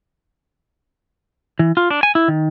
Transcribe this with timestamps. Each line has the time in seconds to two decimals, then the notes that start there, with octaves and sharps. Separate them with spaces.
1.59 E3
1.77 F4
1.90 D4
2.03 G#5
2.15 E4
2.28 D#3